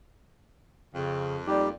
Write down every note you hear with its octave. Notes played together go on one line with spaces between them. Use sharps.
F2 C#3
G3 A#3 D#4 G4 D5